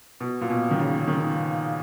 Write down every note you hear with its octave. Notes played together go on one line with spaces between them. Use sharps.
B2
A#2
B2
D#3
C#3
D#3